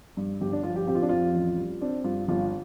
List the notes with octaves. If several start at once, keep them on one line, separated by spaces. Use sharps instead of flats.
G2
G1 G4
D4
F3 F4
G4
C4 G4
F4
D4
F2 F4
A1
G3
C4 D4
G2 F4
G1 F4